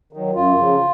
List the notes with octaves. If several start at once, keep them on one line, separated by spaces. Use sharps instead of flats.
D#3 F#3
F#2 F4
C#3 F3